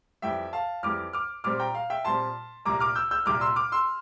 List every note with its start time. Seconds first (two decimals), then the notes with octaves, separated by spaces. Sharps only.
0.22 F2 E3 G3 E5 G5
0.53 F5 A5
0.83 F2 E3 G3 D6 F6
1.13 D6 F6
1.44 A#2 G3 C4 D6 F6
1.60 G5 A#5
1.75 F5
1.90 E5 G5
2.05 A#2 G3 C4 A5 C6
2.65 C2 A#2 G3 A#3 A#5 D6
2.80 D6 F6
2.95 E6 G6
3.11 E6 G6
3.26 C2 A#2 G3 A#3 D6 F6
3.41 C6 E6
3.56 D6 F6
3.72 C6 E6